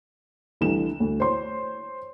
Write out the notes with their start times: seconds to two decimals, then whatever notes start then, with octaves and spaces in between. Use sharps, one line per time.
0.61 C2 E3 A3 D4 E7
1.00 D2
1.20 C5 C#5 C6